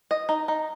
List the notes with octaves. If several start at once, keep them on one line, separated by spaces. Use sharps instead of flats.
D#5
D#4
D#4